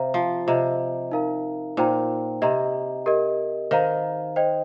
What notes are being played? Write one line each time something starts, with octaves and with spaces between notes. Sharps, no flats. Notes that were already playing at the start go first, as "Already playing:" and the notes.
Already playing: C3 C5 F5 A#5
F3
C3 F4 C5 D#5 A#5
D#4 A#4 F5 A#5
A#2 D#4 C5 G5 A#5
C3 G4 D#5 A#5
G4 A#4 D#5
D#3 C5 F5 A#5
C5 D#5 G5